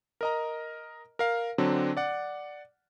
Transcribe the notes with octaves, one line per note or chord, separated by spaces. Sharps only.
A#4 D#5 A#5
A#4 F5
D3 F#3 C4 D4
D5 F#5